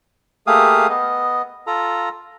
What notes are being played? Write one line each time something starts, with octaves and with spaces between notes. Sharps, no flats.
A3 A#3 G4 G#4 F5 D#6
B3 D#5
F4 A4 A#5